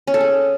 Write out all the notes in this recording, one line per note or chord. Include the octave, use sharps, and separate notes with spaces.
C#4
A4
G#4